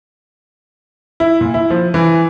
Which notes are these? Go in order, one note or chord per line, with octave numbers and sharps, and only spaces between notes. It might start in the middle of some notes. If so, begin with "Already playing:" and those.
E4
A#2
E4
F3
E3